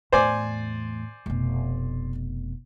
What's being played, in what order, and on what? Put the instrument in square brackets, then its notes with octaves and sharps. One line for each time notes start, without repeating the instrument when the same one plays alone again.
[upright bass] E2 A2 [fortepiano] C5 D5 G#5
[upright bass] F1 B2